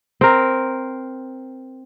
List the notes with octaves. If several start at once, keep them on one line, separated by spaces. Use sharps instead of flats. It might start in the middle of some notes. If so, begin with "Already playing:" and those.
C4 A#4